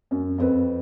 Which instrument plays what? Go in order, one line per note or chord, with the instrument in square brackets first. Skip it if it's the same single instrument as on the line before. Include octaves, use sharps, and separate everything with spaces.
[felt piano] F#2
F2 C4 B4